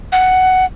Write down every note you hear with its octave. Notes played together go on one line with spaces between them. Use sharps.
F#5